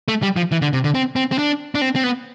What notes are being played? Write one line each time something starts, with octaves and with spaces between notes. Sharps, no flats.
A3
G3
F3
E3
D3
C3
D3
C4
C4
C4
D4
D4
C4
C4
B3